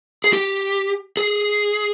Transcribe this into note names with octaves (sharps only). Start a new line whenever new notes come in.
G#4
G4
G#4